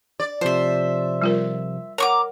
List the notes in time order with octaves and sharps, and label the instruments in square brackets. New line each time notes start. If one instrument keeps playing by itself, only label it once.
[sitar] D5
[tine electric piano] C3 F3 [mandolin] C5 E5
[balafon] G3 F4 A#4
[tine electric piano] A#4 [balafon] C#5 F#5 [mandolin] A#5 C#6 D6